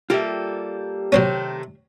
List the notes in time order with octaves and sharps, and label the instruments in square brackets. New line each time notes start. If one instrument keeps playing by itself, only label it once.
[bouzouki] G3 A#3 A4 [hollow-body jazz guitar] F4 G4 E5
[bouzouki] C3 D#3 A3 [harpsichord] F#3 C4 C#4